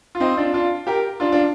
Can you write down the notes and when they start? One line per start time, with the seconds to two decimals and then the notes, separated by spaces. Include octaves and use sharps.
0.15 F4
0.20 C4 D#4
0.37 D4 F4
0.54 D4 F4
0.87 G4 A#4
1.20 D4 F4
1.32 D4 F4